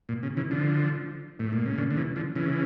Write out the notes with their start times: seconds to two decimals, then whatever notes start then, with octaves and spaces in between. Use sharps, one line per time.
0.09 A#2
0.23 C#3
0.37 C#3 E3
0.51 D3 F3
1.39 A2
1.53 A#2
1.66 C#3
1.78 A#2 D3
1.91 D3
1.97 C#3 E3
2.16 D3 F3
2.35 C#3 E3